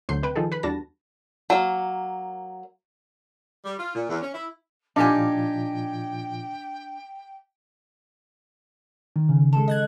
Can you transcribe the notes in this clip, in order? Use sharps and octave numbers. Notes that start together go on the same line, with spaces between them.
D2 F#3 C6 G6 C7
C3 B4 G5
D#3 F3 D#4 G#4 A4
B4 B5
E2 G3 D4 F#4 A5 A#6
F#3 A#3
G3
F4
A#2
E2
C#4
E4
A#2 F3 D4 D#4 F4 G4 G5 G#5
D#3
C#3
G#3 A4
D#5 F#6 G#6